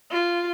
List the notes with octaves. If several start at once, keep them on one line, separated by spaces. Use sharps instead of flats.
F4